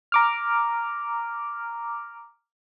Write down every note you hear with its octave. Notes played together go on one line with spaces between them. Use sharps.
A#5 D6 F6